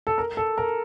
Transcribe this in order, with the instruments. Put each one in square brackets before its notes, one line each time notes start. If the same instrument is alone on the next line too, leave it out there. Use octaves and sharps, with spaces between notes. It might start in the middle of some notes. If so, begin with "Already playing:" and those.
[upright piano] A4
A#4
A4
A#4